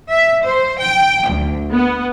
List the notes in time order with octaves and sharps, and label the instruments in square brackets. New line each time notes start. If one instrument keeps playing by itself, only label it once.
[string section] E5
C5
G5
D2
B3